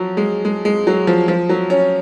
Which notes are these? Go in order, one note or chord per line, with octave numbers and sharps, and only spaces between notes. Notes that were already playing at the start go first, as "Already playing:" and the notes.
Already playing: F3 F#3
G#3
G#3
G#3
F#3
F3
F3
F#3
C#4